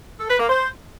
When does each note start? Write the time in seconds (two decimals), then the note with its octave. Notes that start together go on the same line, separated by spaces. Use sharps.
0.19 A4
0.29 B4
0.39 A#3
0.49 C5